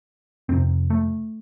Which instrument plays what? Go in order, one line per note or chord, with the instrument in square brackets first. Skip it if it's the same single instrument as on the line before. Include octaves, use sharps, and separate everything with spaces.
[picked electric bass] F2 C3 C4
A3